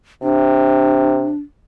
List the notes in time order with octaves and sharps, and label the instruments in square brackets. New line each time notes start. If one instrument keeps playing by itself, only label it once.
[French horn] C3 [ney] D4